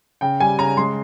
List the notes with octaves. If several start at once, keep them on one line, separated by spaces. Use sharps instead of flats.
C#3 G5
G3 G#5
C#3 A#5
G#3 C6